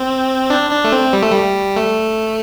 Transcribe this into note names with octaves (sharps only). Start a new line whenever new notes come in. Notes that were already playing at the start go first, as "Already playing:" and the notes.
Already playing: C4
D4
D4
A3
C4
G3
A3
G3
A3